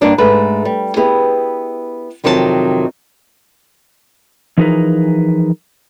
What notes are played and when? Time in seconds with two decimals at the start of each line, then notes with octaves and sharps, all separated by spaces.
0.01 G2 A#3 D4 D#4
0.18 G#2 A3 B4
0.65 G3
0.96 B3 E4 G4 G#4
2.24 F2 C3 D#3 F#3 F4 A5
4.58 E3 F3 D#4 G#4 A#4 B4